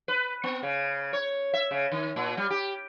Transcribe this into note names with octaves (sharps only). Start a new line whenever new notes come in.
B4
B3
C#3
C#5
E5
C#3
D#3
A#2
G3
G4